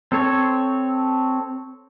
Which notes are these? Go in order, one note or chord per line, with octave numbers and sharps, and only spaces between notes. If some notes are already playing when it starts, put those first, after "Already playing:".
C4 A4 C#5